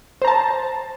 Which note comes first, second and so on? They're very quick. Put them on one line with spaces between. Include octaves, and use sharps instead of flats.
C5 A#5 A5